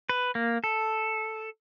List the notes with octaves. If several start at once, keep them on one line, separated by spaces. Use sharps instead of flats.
B4
A#3
A4